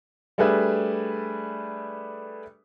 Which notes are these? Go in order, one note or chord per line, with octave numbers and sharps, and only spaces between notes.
G3 A3 D4 G#4 B4 E5